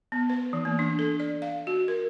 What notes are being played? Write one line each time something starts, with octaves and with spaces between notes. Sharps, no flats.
B3
B4
E3
A#3
D4
A4
D5
F5
F#4
A#4